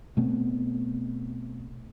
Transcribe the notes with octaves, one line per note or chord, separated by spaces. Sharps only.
B2 A3 B3 C4